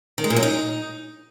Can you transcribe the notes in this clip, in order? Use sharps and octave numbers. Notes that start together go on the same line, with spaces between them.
D#3
G#3
A#2
F#3
D#4